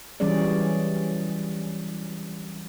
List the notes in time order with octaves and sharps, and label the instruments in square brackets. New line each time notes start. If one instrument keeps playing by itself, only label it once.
[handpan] E3 F#3 G3 C#4 G#4 D5